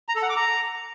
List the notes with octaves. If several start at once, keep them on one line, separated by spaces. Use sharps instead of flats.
A#5
A4
F#5
D6
A#5